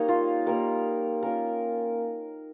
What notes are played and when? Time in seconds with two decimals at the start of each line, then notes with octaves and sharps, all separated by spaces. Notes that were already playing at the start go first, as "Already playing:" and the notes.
Already playing: G3 A#3 D#4 C#5 D#5 F5
0.08 F4
0.46 G3 A#3 D#4 A#4
1.23 A#3 C#4 F4 A#4